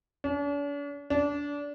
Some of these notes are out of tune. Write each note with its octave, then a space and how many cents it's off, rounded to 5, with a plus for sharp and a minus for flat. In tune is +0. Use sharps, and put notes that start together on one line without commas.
D4 -45
D4 -25